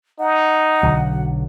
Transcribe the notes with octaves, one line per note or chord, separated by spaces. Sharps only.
D#4 F#5
B1 D3 F#3